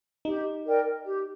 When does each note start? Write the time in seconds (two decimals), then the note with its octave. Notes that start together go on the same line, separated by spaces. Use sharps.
0.25 D#4 G4
0.65 A#4 D5 G5
1.05 G4